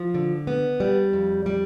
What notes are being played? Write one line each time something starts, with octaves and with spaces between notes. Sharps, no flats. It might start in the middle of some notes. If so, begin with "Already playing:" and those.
Already playing: F3
D3
B3
G3
F2
G3